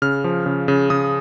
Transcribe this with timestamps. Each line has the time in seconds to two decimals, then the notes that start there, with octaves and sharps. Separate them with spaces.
0.02 C#3 F6
0.24 F3
0.46 C#3
0.68 C#3
0.90 C#3 D#6